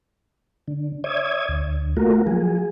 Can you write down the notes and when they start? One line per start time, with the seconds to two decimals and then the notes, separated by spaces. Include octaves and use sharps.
0.68 D3
1.04 C#5 D5 E5 D#6 G#6
1.49 D2
1.97 A3 A#3 F4 F#4 A#4
2.27 F3 F#3 G#4